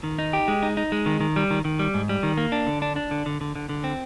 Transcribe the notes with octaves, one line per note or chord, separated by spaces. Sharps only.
D#3
D#4
G4
G#3
D#4
D#4
G#3
D#3
D#3
G3
D#3
D#3
G3
G#2
G3
D#3
A#3
D4
D3
D4
D4
D3
D3
D3
D3
D3
C4